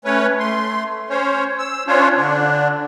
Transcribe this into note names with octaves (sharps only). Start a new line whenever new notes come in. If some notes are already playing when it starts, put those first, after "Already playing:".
A3 C#4 B4 C#5
A3 C6
C#4 C5 C#5
E6
C#4 D4 F4 C5 C#5
D3 D4